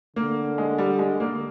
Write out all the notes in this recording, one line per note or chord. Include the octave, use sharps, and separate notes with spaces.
D3 A#3
G#3
G3
G#3
A#3